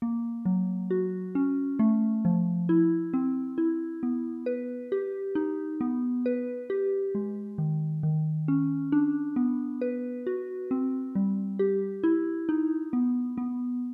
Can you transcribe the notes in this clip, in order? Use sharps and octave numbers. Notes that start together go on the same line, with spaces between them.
A#3
F#3
F#4
C#4
A3
F3
E4
C4
E4
B3
B4
G4
D#4
B3
B4
G4
G#3
D#3
D#3
C#4
D4
B3
B4
F#4
C4
G3
G4
E4
D#4
B3
B3